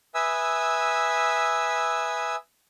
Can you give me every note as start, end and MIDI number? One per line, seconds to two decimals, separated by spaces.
0.15 2.36 71
0.15 2.36 76
0.15 2.36 80
0.15 2.36 87
0.15 2.36 88